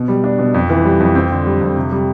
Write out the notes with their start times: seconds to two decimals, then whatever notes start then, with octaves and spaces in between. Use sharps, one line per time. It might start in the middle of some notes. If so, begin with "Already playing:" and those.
Already playing: B2
0.08 G3
0.24 D4
0.39 B2
0.54 F2
0.70 E3
0.85 G3
1.00 F2
1.15 C4
1.31 D3
1.46 G3
1.61 F2
1.76 C3
1.91 G3